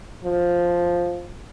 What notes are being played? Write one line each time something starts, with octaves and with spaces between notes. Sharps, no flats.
F3